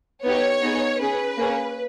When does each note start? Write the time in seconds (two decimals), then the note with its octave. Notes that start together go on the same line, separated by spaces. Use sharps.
0.23 B3 D#4 G4 C#5
0.62 B3 D#4 G#4
1.00 C#4 G#4 B4
1.38 A#3 C#4 G#4